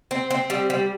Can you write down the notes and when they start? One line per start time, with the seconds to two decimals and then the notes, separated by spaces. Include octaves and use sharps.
0.11 C4
0.30 C4
0.50 G3
0.70 G3